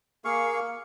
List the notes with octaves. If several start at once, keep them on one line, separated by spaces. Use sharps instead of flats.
A#3 G#4 F5 C#6